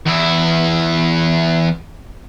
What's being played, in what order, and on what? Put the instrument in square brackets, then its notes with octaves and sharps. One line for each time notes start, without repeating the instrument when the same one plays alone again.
[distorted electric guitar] E2 E4